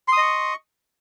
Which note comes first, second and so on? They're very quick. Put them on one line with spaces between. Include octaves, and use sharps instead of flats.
C6 D#6 D#5 C#6